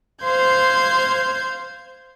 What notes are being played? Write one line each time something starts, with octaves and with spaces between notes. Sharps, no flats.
C5 F5 C6 G6 G#6